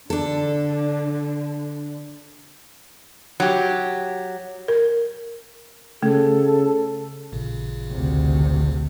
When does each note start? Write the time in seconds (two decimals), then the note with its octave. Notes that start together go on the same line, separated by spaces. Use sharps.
0.10 D3 D4 A4
3.40 F#3 G4
4.68 A#4
6.03 C#3 A3 A4
7.33 A1 A#2 C#3
7.91 D2 C3